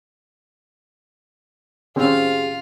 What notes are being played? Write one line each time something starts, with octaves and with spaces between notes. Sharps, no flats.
A2 D#3 C4 C#4 F4 G4 G#4 F5